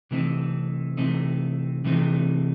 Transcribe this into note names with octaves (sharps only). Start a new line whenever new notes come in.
C3 E3 A3 C4 D#4
C3 E3 A3 C4 D#4
C3 E3 A3 C4 D#4